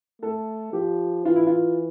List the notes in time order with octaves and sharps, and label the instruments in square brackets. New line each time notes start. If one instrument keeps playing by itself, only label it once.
[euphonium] A3 [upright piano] A4
[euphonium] F3 [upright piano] G4
[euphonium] E3 [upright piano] F4
[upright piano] E4
F4